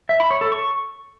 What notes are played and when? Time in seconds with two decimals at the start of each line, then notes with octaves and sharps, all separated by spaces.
0.09 E5
0.20 B5
0.31 C#5
0.41 A4
0.52 C#6